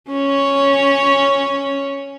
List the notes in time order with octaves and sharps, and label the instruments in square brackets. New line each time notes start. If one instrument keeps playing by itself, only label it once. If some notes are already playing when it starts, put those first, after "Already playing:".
[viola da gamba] C#4 C#5